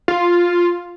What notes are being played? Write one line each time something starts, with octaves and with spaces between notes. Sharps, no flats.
F4